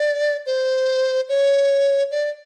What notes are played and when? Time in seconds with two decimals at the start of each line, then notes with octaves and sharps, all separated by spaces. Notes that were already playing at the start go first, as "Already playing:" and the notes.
Already playing: D5
0.46 C5
1.29 C#5
2.11 D5